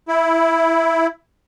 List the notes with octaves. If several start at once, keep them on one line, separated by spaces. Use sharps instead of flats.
E4